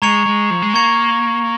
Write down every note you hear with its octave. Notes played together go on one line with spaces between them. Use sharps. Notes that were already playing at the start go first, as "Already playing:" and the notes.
G#3 A#5 C#6 G#6 C#7 F7
G#3
F3
G#3
A#3 A#5 C#6 G#6 C#7 F7